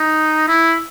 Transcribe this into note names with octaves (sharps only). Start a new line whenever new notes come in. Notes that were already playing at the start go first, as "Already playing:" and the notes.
Already playing: D#4
E4